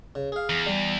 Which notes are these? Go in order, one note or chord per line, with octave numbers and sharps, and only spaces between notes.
C#3
G#4 F5
E2
G3